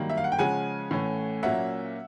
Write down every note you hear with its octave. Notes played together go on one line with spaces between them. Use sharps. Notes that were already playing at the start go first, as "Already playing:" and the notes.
Already playing: G2 D#3 F#3 A#3
E5
F5
F#5
G5
C#3 F3 G#3 C#4 F#5 G#5
A2 E3 A3 C#4
A#2 F#3 A#3 C#4 E5 F#5